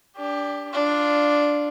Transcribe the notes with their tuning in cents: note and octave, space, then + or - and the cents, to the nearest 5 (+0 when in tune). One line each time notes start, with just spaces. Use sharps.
D4 -15 G4 +15
D4 +0 F4 +0